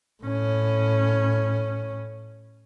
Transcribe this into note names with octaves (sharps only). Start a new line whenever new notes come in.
A2 C#4